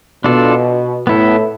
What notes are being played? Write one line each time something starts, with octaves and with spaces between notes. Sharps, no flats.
B2 D4 F4 A4 D5
A2 B3 E4 A4